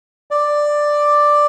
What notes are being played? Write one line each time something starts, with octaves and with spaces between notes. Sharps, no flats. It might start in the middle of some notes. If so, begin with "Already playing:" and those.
D5